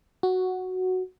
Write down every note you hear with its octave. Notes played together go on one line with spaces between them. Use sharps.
F#4